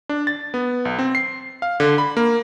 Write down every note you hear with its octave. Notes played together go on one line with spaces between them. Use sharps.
D4
A6
B3
B1
C4
C7
F5
D3
B5
A#3